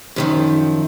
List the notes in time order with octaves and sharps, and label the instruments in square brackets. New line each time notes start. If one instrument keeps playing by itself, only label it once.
[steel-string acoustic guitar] F#2 D#3 F3